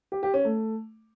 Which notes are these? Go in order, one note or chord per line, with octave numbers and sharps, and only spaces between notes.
G4
G4
C#4
A3